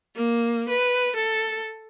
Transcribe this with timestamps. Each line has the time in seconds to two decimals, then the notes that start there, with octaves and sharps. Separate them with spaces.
0.15 A#3
0.68 B4
1.15 A4